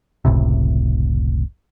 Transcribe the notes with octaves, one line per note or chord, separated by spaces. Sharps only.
F#1 C#2 A2 C3